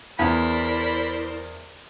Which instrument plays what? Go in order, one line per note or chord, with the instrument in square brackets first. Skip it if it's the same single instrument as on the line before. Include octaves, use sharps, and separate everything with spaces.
[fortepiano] E2 [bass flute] E4 [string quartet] A#4 C5 D5 [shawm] B5